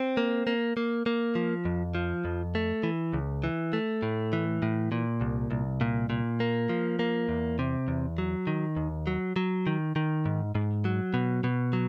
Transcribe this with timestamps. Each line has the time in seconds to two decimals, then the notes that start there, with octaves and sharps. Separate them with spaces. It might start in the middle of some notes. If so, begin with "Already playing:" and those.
Already playing: C4
0.17 A#3
0.47 A#3
0.77 A#3
1.06 A#3
1.35 F3
1.65 F2
1.95 F3
2.25 F2
2.55 A3
2.83 E3
3.13 C#2
3.44 E3
3.73 A3
4.02 A2
4.33 E3
4.62 A2
4.92 A#2
5.21 C2
5.51 C2
5.81 A#2
6.10 A#2
6.40 A#3
6.69 F3
6.99 A#3
7.29 E2
7.59 C3
7.88 E2
8.18 F#3
8.47 D#3
8.76 D#2
9.07 F#3
9.36 F#3
9.67 D#3
9.96 D#3
10.26 G#2
10.55 G#2
10.85 F#3
11.14 B2
11.44 B2
11.73 F#3